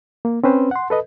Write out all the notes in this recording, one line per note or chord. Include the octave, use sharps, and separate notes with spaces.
A#3
C4 C#4 B4 C5
F#5 C6
A4 B4 D#5